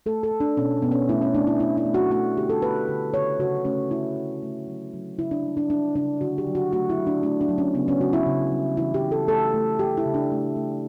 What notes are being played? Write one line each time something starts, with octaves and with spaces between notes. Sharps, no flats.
A3 A4
A4
A3
D4
B2 C#4
B2 B3
C#4
A3 E4
C#4
A3 D4
E4
A3 E4
E4
A3
F#4
A3 F#4
D3 G4
A4
A3 B4
D3
C#3 C#5
C#3 F#4
A3 C#4
A3 E4
A3
A3
F#3
F#3
C#3 E4
D4
G3
D4
G3 D4
C#3 D4
D3 F#4
G4
F#3
F#4
A3 F#4
E4
F#3
D4
A3 D4
D4
F#3
C#4
C#3 B3
C#4
C#3 F#4
E4
C#3
G3
E3 E4
G4
E3
A4
A3 A4
A3
A3 G4
E4
C#3
D4
A3
A3